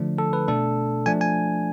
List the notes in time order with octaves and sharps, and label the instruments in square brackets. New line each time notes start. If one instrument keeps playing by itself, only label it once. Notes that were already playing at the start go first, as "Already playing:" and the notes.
Already playing: [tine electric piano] D3 F3 A3 D4
A4
B4
B2 A3 D4 A4
F3 A3 D4 G#5
G#5